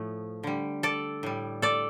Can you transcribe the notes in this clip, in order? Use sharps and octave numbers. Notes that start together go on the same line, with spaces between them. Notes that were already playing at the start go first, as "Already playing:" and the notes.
Already playing: A2 F3 A3
D3 G3
A4 D5
A2 G3
A4 D5